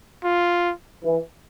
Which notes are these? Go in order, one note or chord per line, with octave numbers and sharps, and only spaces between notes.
F4
E3